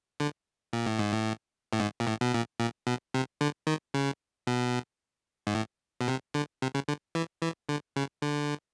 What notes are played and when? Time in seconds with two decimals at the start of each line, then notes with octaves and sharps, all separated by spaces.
0.20 D3
0.73 A#2
0.86 A2
0.99 G#2
1.12 A2
1.73 A2
1.80 G#2
2.00 A#2
2.07 A2
2.21 B2
2.34 A#2
2.60 A#2
2.87 B2
3.14 C3
3.41 D3
3.67 D#3
3.94 C#3
4.47 B2
5.47 G#2
5.54 A2
6.01 B2
6.08 C3
6.34 D3
6.62 C3
6.75 C#3
6.88 D3
7.15 E3
7.42 E3
7.69 D3
7.96 C#3
8.22 D3